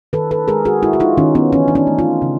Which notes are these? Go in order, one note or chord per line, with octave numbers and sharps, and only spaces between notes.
D#3 A4 B4
A4 B4
G#3 G#4 A#4
F#4 G#4
G#3 E4 F#4
F#4
D#4 F4
D#3 C#4 D#4
B3 C#4
E3 C#4 D#4
D4
C#4 D#4
A3
D#4 F4
C#3